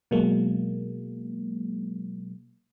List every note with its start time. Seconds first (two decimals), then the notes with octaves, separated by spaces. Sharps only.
0.11 B2 F#3 G#3 A#3